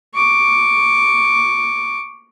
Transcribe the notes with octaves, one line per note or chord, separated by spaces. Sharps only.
C#6 D6